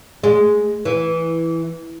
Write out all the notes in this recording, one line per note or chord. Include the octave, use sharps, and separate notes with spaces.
G#3
E3